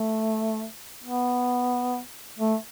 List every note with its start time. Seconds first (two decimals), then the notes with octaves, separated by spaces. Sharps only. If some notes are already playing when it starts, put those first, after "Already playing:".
Already playing: A3
1.04 B3
2.39 A3